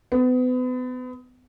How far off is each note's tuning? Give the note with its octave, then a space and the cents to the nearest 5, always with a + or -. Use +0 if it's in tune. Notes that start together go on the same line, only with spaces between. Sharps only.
B3 +35